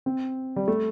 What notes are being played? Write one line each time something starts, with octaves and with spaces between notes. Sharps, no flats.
C4
G3
A3